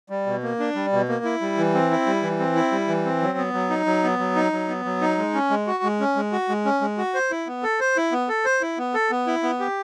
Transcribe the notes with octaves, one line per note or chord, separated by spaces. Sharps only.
G3
B2
A#3
D4
G3
B2
A#3
E4
G3
E3
C4
E4
G3
E3
C4
E4
G3
E3
C4
F#3
B3
F#3
D#4
F#3
B3
F#3
D#4
F#3
B3
F#3
D#4
G#3
C#4
G#3
F#4
G#3
C#4
G#3
F#4
G#3
C#4
G#3
F#4
C5
E4
B3
A4
C5
E4
B3
A4
C5
E4
B3
A4
B3
E4
B3
G4